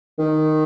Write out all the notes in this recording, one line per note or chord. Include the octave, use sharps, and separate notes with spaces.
D#3